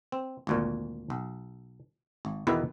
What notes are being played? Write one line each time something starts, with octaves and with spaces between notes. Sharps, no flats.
C4
G#1 D2 A#2
B1
G#1
E2 B2 D#3 E4 B4